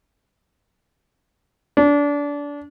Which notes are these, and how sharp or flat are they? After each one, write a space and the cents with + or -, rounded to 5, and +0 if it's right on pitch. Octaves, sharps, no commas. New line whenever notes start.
D4 -25